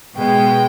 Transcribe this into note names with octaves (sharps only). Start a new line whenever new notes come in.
B2 G#3 B3 G5